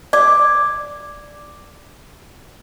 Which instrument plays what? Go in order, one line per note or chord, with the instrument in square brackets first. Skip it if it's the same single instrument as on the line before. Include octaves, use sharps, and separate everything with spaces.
[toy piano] D5 [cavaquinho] D6